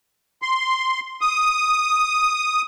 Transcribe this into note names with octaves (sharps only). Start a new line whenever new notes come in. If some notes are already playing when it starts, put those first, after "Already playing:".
C6
D#6